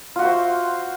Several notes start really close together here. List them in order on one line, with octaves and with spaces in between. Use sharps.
F4 F#4 E5 C5